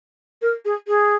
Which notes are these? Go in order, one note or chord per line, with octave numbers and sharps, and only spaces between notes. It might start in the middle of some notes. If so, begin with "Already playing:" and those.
A#4
G#4
G#4